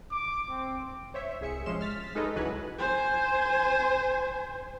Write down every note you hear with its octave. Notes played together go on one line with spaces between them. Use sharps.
D6
C4
C5 C#5 E5
C2 G#4 E5 C#7
A1 F3 G#3 C#4 C6 E7
F6 A6 B6
G#3 D#4 A4 B4 C#5 D#5
C#2 E3 F#3 B4 G#5 F#6
C5 G#5